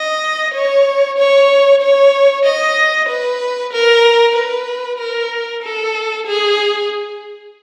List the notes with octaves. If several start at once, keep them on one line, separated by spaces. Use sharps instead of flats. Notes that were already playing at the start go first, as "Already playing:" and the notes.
Already playing: D#5
C#5
C#5
C#5
D#5
B4
A#4
B4
A#4
A4
G#4